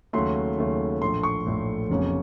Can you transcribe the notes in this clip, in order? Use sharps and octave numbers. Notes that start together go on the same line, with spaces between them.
D#2 C#3 F#3 A3 C6
D#2 C#3 F#3 A3
A#1 A2 A3 C6
C#6
A#1 A2 A3
F1 F2 C#3 F#3 A#3